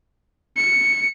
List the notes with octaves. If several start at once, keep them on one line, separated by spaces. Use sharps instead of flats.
C#7